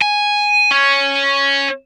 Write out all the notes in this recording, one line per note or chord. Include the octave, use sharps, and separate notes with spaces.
G#5
C#4